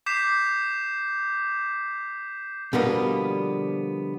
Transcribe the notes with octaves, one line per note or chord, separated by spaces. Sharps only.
D6 G6 B6 C7 E7
B2 D3 F3 G3 A#3 B3